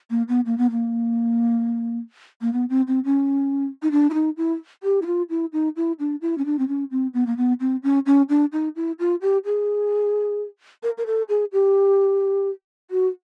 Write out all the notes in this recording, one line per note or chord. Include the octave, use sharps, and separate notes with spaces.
A#3
B3
A#3
B3
A#3
A#3
B3
C4
C4
C#4
D#4
D4
E4
D#4
E4
G4
E4
F4
E4
D#4
E4
D4
E4
C#4
D4
C4
C#4
C4
B3
A#3
B3
C4
C#4
C#4
D4
D#4
E4
F4
G4
G#4
A#4
A#4
A4
G#4
G4
F#4